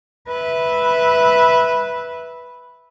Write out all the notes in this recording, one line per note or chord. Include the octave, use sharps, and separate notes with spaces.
B4 E5